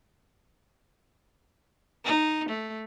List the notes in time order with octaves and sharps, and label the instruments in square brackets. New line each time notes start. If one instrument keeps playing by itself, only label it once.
[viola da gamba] D#4
A3